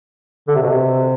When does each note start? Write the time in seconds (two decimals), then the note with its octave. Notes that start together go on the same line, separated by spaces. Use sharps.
0.48 D3
0.55 C3
0.62 B2
0.69 C3